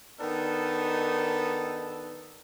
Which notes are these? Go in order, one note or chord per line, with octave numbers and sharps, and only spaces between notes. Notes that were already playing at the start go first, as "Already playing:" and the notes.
D#3 B3 D4 D#4 A4